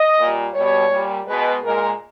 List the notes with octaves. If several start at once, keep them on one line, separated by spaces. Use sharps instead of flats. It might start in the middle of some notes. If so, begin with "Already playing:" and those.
Already playing: D#5
A#2 G3
B2 G3 C#5
A#2 G3
B2 G#3 B4
A#2 G#3 A#4